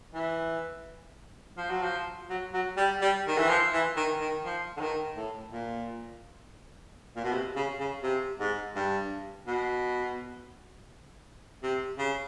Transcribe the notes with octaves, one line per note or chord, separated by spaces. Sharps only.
E3
F3
F#3
F3
F#3
F#3
G3
G3
D#3
E3
F3
E3
D#3
D#3
F3
D3
D#3
A2
A#2
A#2
B2
C3
C#3
C#3
C3
G#2
G2
B2
C3
C#3